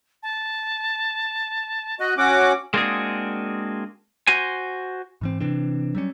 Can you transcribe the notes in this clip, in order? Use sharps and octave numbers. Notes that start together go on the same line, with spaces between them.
A5
F#4 D#5 F#6
C#4 F#4 F#5 D6
G#3 A#3 C4 D4 F#4 G#4
F#4 C5 G#5
G#2 E3 C4
C3 E3 C4 D4
F#3 G3 C#4